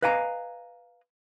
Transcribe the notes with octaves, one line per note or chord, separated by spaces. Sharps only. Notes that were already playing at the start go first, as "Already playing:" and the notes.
B4 D#5 F5 G#5 A#5